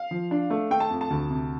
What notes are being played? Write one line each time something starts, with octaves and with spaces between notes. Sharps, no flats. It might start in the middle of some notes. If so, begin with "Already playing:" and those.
Already playing: F5
F3
D4
A3
A3 G5
A5
F2
A5
D2
C3